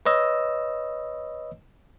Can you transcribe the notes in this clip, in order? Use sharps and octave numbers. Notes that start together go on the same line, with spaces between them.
B4 C#5 D#5 E6